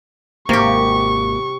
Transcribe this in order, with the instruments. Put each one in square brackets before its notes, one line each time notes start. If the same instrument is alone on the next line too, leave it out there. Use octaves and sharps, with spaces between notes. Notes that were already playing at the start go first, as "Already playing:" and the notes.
[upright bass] G#1 [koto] C3 G4 [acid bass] A#3 [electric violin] C#6